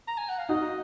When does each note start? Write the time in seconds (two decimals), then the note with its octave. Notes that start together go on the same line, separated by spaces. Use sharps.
0.07 A#5
0.17 G#5
0.29 F#5
0.38 F5
0.49 D#4 F#4 D#5